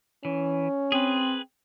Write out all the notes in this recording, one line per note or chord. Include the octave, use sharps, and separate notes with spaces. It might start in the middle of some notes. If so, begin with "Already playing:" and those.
E3 C#4
C4 G#4 B4